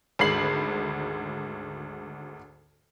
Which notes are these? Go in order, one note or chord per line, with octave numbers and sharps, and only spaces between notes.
G#1 D2 G#3 B5 C7 F#7